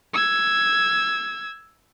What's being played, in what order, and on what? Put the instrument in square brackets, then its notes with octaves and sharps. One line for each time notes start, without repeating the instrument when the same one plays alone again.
[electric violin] E6 G#6